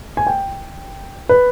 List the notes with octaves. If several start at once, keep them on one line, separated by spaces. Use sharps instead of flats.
G#5
G5
B4